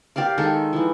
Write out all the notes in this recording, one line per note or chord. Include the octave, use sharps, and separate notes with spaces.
G4 A#4 D5 F5
D#3 G#3 G#4 A4
E3 F3